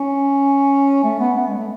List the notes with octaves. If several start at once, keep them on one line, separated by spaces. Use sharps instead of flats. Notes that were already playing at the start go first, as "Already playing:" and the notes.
Already playing: C#4
A3
B3
B3
G#3
A3